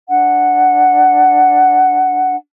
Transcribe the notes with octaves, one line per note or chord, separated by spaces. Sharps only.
D4 F#5